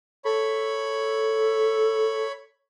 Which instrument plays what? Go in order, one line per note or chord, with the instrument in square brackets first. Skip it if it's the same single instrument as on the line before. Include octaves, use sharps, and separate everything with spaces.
[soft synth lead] A4 [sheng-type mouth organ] C#5 B5